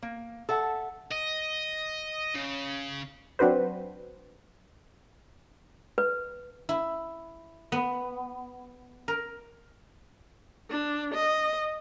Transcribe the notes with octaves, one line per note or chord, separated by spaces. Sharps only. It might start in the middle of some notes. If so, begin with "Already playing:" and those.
A#3
A4 E5 F#5
D#5
C#3
F#3 C4 D4 F#4 B4 C5
B4
E4
B3
A#4
D4
D#5